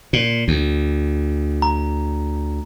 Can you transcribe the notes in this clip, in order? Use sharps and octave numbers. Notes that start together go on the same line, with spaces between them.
A#2
D2
A#5